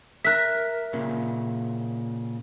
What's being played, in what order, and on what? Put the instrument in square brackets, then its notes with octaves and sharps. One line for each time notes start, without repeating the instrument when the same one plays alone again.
[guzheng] A#4 E5 [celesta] F#6 B6
[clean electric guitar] A#2 C#3